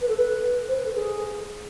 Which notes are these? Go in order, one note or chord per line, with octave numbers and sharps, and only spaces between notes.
B4
A4
B4
C5
B4
A4
G#4